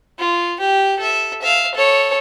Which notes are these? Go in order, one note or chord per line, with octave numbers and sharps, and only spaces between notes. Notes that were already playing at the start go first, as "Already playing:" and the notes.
F4
G4
A4 E5
E5 F5
A4 C#5